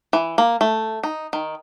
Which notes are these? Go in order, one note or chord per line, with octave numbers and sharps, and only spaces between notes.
E3
A#3
A3
D#4
D#3